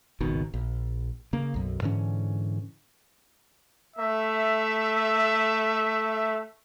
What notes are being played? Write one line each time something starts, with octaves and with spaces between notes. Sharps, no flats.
G#1 C#2 B2 D#3
A#1
C#3 A#3
B1 F#2
G#2 D3 E3 C#4
A3 E5